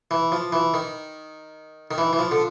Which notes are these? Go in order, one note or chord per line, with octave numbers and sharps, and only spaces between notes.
E3
F3
E3
D#3
D#3
E3
E3
F3
D3